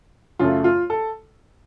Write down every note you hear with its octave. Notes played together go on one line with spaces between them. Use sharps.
F#2 C#3 A3 F4
F4
A4